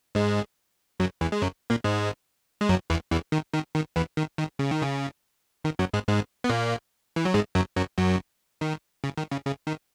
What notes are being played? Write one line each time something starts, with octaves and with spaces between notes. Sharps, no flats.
G#2 G#3
F#2 F#3
E2 E3
G#3
F#2 F#3
A#2 A#3
G#2 G#3
G#3
F#2 F#3
E2 E3
E2 E3
D#3
D#3
D#3
E2 E3
D#3
D#3
C#3
D#3
C#3
D#3
F#2 F#3
G#2 G#3
G#2 G#3
B3
A#2 A#3
E3
F#3
G#2 G#3
F#2 F#3
F#2 F#3
F#2 F#3
D#3
C#3
D#3
C#3
C#3
D#3